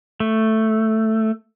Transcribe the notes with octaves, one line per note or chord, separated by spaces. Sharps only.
A3